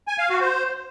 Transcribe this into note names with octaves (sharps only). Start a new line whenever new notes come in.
G#5
F5
F#4
C5